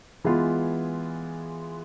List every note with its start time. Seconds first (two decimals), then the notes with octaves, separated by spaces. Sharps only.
0.24 E3 G#3 B3 F4